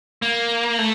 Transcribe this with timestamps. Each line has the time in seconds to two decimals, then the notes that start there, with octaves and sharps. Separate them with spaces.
0.22 A#3
0.78 A3